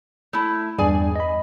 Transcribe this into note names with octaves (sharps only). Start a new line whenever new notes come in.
A3 E4
E2 G2 G#4 D5 G#5
D#5 B5